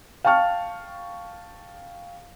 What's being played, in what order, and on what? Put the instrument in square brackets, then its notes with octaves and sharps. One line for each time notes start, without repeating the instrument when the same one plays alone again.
[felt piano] F5 G5 A5 C#6 F6